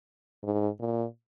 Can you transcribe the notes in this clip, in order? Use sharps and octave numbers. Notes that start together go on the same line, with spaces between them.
G#2
A#2